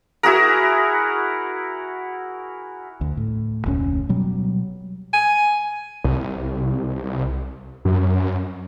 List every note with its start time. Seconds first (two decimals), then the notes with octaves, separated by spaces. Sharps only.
0.23 E4 F#4 G#4 A#4
3.01 D2
3.17 A2
3.66 F1 D2 A#2 C#4
4.09 B2 F#3 G3
5.13 G#5
6.04 C2
7.85 F#2